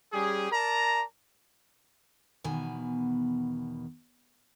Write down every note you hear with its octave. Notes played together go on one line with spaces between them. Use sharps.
G3 C#4 G4 G#4
A#4 D5 A5 A#5
E2 B2 D#3 G#5